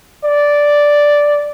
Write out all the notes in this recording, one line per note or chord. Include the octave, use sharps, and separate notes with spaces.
D5